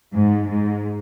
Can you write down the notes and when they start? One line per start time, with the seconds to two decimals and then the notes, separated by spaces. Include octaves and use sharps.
0.14 G#2
0.49 G#2